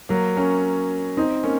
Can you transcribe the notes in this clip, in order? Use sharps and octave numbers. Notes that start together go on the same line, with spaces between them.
F#3 A#3
A#3 C#4
C4 D#4
A#3 C#4